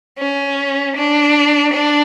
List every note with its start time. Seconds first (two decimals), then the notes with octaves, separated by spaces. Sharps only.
0.18 C#4
0.96 D4
1.73 D4